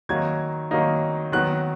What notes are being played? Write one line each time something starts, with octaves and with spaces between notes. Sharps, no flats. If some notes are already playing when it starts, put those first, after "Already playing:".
D#3 F#3 A#3 D#4 G#6
D#3 F#3 A#3 D#4
D#3 F#3 B3 F#6